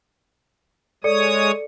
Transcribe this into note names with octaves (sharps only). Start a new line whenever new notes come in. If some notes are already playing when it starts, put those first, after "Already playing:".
G#3 A4 C#5 D5 D#6 C#7